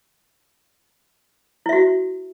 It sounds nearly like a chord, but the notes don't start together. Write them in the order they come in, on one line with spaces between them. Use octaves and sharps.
E4 E5 F#4